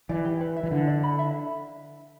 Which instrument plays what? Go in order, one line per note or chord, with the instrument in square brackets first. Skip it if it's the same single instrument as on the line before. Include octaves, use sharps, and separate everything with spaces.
[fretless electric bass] E3 [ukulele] D5
[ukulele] G4
B4
E5
[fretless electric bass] E3
[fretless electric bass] D3 [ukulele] E4
[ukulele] D5
B5
E5